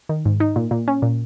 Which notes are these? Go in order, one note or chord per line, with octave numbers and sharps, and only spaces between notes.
D#3
G#2
D#4
A#2
A#2
C#4
A#2